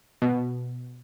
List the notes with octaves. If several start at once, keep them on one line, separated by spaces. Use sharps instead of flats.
B2